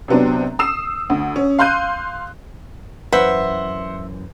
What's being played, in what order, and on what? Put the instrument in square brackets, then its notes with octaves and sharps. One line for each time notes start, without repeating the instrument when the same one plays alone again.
[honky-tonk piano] C3 F#3 B3 C4 D4
D#6 E6 C7 E7
D2
C#4
F5 C6 F#6 G6 D#7
[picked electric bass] F#2 E3 [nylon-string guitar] B4 [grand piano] C5 F#5 [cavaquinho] E5